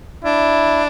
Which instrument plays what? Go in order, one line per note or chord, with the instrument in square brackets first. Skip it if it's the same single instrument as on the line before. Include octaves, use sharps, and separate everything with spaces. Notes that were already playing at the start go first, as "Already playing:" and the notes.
[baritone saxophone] D4 [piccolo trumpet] E4